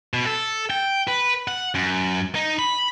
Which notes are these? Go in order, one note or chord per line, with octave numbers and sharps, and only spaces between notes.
B2
A4
G5
B4
F#5
F#2
D#4
B5